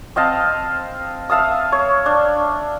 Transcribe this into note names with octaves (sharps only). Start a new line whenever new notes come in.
C4 D#5 F5 A5
E5 F5 A5 D#6
C#5
D4